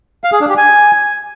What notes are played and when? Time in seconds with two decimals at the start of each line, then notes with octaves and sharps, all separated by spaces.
0.24 F5
0.32 G#4
0.40 D4
0.49 G4
0.57 G#5